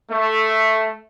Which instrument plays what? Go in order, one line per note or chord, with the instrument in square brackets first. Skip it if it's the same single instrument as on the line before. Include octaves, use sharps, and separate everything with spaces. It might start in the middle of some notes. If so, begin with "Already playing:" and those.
[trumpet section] A3